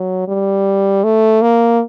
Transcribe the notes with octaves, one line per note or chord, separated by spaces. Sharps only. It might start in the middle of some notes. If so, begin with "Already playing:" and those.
Already playing: F#3
G3
A3
A#3